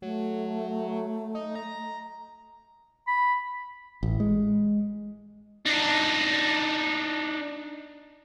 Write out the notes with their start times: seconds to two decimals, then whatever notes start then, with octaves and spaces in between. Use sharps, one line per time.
0.02 F#3 A3
1.35 D#4
1.55 A#5
3.08 B5
4.03 A1
4.20 G#3
5.66 D4 D#4